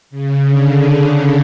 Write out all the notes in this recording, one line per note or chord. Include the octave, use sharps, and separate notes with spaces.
C#3
D3